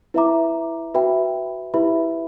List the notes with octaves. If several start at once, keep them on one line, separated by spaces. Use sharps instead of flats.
E4 B4 E5 A#5 D6
F#4 B4 E5 G5 B5
E4 G4 B4 E5 B5